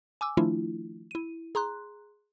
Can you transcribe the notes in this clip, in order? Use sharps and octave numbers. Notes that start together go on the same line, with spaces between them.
G#5 D6 E6
D#3 F3 A3 D4 E4 F4
E4 D#7
G#4 A#5 C6 F#6